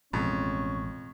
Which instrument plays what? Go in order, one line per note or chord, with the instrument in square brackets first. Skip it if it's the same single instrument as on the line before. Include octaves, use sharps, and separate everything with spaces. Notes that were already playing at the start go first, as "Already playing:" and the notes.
[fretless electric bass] A1 B2 G#3 [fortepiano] F2 [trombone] C#4 [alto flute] C#6